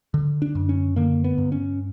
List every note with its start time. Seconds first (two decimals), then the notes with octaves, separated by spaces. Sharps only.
0.14 D3
0.42 D4
0.55 F#2
0.69 C#4
0.96 D3 A#3
1.24 B3
1.38 G2
1.52 C#4